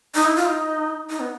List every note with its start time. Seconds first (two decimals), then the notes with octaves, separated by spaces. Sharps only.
0.15 D#4
0.25 E4
0.36 F4
0.46 D#4
1.10 D#4
1.20 B3